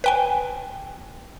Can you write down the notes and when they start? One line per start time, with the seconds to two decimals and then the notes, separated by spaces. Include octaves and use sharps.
0.04 B4 G5 G#5